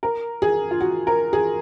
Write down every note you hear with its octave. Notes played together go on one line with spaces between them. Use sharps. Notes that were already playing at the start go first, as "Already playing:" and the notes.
A#4
G#4
F4
F#4
A#4
G#4